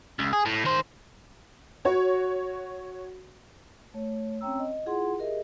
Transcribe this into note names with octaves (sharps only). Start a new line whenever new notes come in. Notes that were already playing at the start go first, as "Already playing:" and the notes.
C#2
G#4
A2
D#3 C5
F#4 C#5
A3 C#5
C4 C#4 C#5 G5 A#5 E6
D#5
E4 F4 G#4 F#5 C6
G4 G#4 A#4 D#5 E5